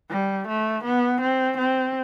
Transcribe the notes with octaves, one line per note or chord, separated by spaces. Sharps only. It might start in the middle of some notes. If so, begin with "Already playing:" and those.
G3
A3
B3
C4
C4